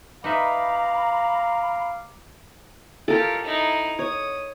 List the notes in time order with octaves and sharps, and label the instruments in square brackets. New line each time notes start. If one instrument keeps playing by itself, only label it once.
[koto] D#4 B4 E5 [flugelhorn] F5 [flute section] A#5 B5 [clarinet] D6
[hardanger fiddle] F4 G4 [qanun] A4 A#4
[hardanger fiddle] D#4 E4
[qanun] C#5 [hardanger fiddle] D#6